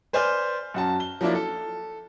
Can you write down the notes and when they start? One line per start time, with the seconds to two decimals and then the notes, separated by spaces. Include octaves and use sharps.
0.13 B4 C5 D5 G#5 F6 G6
0.74 F#2 F#4 A5
1.00 G7
1.21 F3 F#3 A#3 D4 E4
1.35 A4